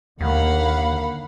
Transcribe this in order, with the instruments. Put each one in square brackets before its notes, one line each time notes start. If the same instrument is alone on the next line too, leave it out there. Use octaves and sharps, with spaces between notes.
[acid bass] D#2 [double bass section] D3 D#3 A#3 [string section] F5 F#5 B5